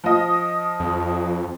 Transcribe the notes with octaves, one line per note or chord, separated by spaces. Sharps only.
F3 D#5
F2